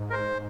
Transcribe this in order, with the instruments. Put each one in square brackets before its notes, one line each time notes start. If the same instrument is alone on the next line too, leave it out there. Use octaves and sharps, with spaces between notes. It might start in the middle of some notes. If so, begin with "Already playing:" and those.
Already playing: [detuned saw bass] G#2
[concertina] A#4
C5